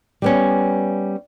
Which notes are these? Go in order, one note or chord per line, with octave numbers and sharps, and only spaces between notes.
G3 B3 C#4